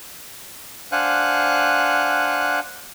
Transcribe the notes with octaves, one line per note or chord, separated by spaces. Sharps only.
D4 C5 F5 F#5 G#5 F#6